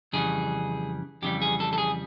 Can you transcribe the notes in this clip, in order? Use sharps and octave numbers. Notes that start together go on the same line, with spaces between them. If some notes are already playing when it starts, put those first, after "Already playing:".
F2 C#3 E3 G3 G#4
F2 C#3 E3 G3 G4
G#4
A4
A4
G#4